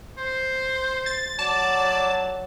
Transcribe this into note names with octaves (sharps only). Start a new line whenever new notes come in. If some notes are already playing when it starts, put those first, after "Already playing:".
C5
A6
F#3 D5 A5